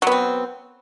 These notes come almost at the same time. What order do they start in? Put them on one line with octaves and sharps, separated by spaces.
F#3 B3 C4